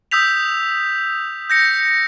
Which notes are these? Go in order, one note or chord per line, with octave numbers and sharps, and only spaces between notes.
D#6 E6 G6 B6 F7
G6 A#6 C#7